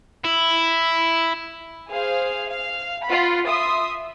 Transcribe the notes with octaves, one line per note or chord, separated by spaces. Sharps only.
E4
G#4 C5 F5
F5
F4 F#5 B5
E5 C6 D#6